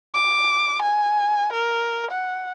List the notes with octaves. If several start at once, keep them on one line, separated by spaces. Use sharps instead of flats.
D6
G#5
A#4
F#5